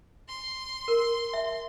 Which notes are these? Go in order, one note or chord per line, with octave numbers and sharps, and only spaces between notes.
C6
A#4
E5